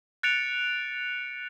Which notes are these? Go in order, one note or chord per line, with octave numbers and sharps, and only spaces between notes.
F#6 A6 C#7 D7 F7